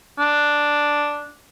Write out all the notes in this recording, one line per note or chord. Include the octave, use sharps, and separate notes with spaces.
D4